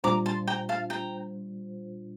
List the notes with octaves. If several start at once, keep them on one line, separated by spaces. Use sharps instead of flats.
A#2 G3 D4 F4 C5 A#5 D6
A5 C6
G5 A#5
F5 A5
G5 A#5